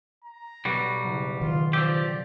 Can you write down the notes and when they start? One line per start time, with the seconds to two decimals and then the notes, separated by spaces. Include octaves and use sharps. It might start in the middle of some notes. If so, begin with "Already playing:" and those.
0.24 A#5
0.65 B1 G3 F#4
1.04 F#1
1.42 D#3 F4
1.73 F3 G4 D5 E6 G#6